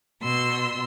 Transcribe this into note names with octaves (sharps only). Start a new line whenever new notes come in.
B2 C6 E6